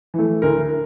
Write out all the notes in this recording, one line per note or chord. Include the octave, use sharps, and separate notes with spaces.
E3 A3
D2 A#4